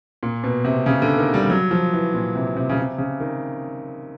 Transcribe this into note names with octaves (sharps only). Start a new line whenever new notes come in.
A#2
B2
C3
C#3
D3
D#3
G3
F#3
F3
E3
A#2
C3
C3
C#3
C3
C#3
D#3